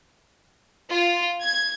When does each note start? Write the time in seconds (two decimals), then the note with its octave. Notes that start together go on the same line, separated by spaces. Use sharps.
0.89 F4
1.41 G#6